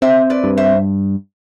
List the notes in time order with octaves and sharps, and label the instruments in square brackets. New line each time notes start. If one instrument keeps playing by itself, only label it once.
[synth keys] C4 [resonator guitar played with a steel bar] C5 E5
[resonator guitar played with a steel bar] B4 D5
[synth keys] G2
[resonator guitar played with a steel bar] C5 E5